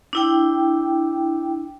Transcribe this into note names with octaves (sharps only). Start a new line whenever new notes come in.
D4 E4 G5